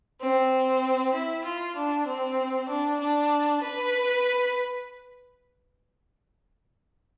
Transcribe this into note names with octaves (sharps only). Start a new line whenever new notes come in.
C4
E4
F4
D4
C4
D4
D4
B4